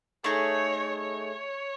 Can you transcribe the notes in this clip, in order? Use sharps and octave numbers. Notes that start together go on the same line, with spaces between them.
A3 D#4 G#4 C#5
C#5